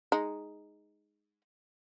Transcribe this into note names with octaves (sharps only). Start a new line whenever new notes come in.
G#3 D#4